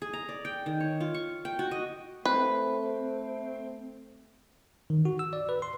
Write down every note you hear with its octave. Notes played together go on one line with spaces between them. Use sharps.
G#4
A#5
D5
G5
D#3
C#5
F4
C#6
G5
F#4
D#5
A3 C4 B4
D#3
F#4
E6
D5
B4
C6